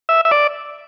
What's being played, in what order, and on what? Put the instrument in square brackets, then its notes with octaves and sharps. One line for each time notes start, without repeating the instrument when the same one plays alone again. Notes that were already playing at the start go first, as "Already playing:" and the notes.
[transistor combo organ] E5
E5
D5